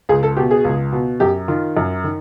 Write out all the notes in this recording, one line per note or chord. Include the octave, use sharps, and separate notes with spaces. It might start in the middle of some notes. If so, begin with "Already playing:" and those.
C#2 G#4
A4
B2 G4
G#4
C#2
B2
F#2 G4
D#3 F4
F#2
D#3